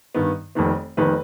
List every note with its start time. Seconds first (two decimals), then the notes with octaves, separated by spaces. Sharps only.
0.14 G2 D#3 B3
0.55 F1 F2 D#3 B3
0.97 F1 F2 D#3 B3 B4